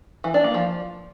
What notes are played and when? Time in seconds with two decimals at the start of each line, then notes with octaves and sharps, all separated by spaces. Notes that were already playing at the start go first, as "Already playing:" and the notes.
0.24 E3
0.34 D4
0.44 A#3
0.54 F3